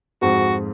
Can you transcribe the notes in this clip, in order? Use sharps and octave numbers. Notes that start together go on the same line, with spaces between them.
F2 G#2 F#4